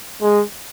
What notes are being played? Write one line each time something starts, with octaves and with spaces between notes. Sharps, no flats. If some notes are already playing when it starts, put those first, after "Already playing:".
G#3